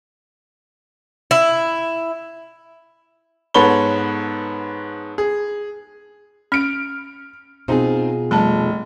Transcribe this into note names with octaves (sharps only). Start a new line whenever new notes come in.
E4
G#2 B3 A4 C#5 B5 G7
G#4
C#4 F6 D7
B2 C4 D#4 F4 G#4
F1 G3 A5